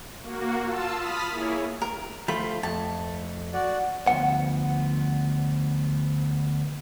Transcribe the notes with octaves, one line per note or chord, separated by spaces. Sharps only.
A#3 F#4
F4 A5 E6
B5 D#6 F6 A6 B6
A#3 E4 G#4 C#5
A#4
F3 A3 F4 B5
F2 A3 A5
F#4 D5 F#5
D2 C#3 F3 B3 F#5